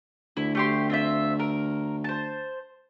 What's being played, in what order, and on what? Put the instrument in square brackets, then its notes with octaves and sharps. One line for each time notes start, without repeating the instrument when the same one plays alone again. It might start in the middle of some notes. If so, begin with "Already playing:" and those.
[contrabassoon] D2 [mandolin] E4
[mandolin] A3 G4 C6
C4 F4 E5
A#4
C5 A5